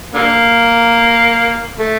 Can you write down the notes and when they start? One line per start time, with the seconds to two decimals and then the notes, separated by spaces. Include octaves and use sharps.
0.15 D3 A#3
1.79 A3